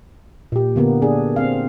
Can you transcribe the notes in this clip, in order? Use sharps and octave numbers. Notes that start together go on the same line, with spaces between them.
A#2 G4
D3 A#3 B3
D4 G#4
C4 F5